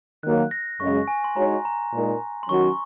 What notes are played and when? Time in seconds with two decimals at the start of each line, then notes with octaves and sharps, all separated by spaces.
0.23 D#3 F#3 A#3 F#6
0.51 A#6
0.80 F#2 C#3 G#3 C#6
1.08 G#5
1.24 C6
1.36 G#3 D#4 F#4 C#5 A#5
1.65 A#5
1.93 A#2 G#3 D#4 A#4
2.43 C6
2.49 D#3 F#3 C#4 F#4 C#6